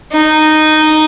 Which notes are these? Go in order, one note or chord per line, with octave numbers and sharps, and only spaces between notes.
D#4